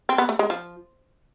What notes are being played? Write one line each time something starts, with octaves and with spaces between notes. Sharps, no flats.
C4
B3
A3
G#3
F3